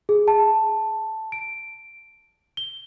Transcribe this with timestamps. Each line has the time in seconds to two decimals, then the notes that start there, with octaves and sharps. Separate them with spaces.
0.09 G#4
0.28 A5
1.32 D7
2.57 G7